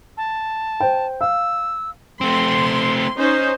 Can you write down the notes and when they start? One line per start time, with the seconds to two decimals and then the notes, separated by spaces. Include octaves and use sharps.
0.17 A5
0.80 C5 G5
1.21 F5 E6
2.21 A3 C4 C6
3.16 C#4 D#4 C5